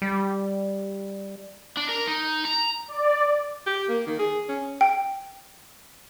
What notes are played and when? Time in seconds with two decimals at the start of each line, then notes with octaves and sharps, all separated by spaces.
0.02 G3
1.77 D4
1.89 A#4
2.07 D#4
2.45 A#5
2.88 D5
3.66 G4
3.88 A#3
4.06 D#3
4.19 G#4
4.48 C#4
4.81 G5